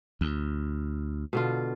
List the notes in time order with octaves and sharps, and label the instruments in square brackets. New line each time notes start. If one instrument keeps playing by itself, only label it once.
[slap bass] D2
[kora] B2 D3 F4